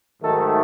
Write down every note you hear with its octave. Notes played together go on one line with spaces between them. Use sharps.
G#2 D#3 F#3 A3 A4